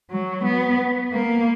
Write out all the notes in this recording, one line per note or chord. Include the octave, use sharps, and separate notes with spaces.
F#3
B3
A#3